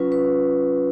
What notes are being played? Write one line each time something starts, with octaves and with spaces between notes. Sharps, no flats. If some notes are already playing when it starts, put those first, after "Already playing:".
Already playing: F#3 C#4 F4 B4
B4